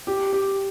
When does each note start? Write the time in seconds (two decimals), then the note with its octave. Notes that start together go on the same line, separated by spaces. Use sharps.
0.07 G4
0.33 G4